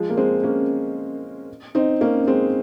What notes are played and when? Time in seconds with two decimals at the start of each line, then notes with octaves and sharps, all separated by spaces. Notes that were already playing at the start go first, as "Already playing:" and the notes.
Already playing: F3 G#3
0.10 A#3
0.17 G#3 C4
0.43 A#3 C#4
1.75 C4 D#4
2.01 A#3 C#4
2.27 G#3 C4